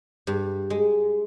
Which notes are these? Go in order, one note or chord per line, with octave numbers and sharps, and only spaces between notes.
G2
G#3